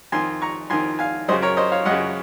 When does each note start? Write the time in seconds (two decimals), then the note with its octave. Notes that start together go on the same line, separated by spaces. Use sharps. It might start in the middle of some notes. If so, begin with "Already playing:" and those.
0.12 F2 D#3 G#5 C6
0.42 A#5 C#6
0.70 F2 D#3 G#5 C6
0.99 F5 G#5
1.28 F#2 C5 D#5
1.32 C#3
1.42 A#4 C#5
1.57 C5 D#5
1.72 C#5 F5
1.85 F#2 D#5 F#5
1.91 C#3